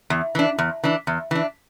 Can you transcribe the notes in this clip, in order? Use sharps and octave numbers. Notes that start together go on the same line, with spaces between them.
E2
E3 D4
E2
E3 D4
E2
E3 D4